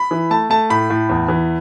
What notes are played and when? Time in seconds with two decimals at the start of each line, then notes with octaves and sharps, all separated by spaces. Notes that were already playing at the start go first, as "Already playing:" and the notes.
Already playing: B5
0.11 E3
0.30 A3 A5
0.50 A3 A5
0.70 A2 B5
0.90 A2
1.09 E2
1.28 E3